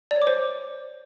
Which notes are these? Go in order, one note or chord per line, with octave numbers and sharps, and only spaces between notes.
D5
C#5
D6
C5